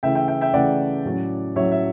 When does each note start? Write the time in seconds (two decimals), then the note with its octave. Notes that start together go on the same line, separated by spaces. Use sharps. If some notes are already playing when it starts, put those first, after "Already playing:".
0.03 C#3 E3 A3 E5 G5
0.15 E5 G5
0.28 E5 G5
0.41 E5 G5
0.53 C#3 E3 A3 D5 F#5
1.05 A2 F#3 C#4
1.56 A2 F#3 C#4 C#5 E5
1.71 E5